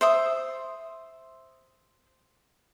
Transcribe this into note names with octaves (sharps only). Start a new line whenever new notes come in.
C5 E5 D#6